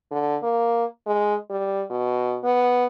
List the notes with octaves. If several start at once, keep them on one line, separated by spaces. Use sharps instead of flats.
D3
A#3
G#3
G3
B2
B3